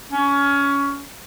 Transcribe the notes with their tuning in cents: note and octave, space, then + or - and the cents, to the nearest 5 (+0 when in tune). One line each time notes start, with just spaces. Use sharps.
C#4 +20